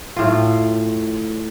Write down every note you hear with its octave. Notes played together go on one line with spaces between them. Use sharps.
A2 F4